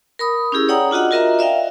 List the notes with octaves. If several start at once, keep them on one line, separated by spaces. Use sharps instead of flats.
A#4 B5 D#6
C#4 E4 G4 G#4 E6
C#5 D5 F#5 G5 A#5 D#6
D4 F4 F#4 D#5 F#5
F4 F#4 A#4 D#5 E5 A#5
D5 E5 F5 G5